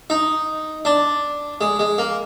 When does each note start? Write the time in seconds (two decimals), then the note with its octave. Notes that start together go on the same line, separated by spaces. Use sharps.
0.10 D#4
0.85 D4
1.61 G#3
1.79 G#3
1.98 A#3